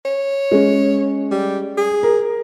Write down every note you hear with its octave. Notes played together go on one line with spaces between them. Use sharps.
C#5
G#3 C#4
G3
G#4
A#4